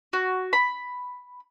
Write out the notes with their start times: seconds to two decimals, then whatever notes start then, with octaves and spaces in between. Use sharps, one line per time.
0.13 F#4
0.53 B5